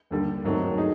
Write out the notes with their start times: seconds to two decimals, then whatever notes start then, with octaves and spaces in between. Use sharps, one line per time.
0.11 D#2 D3 G3
0.44 G#2 D#3 F#3 A3 C4
0.77 D#4 G#4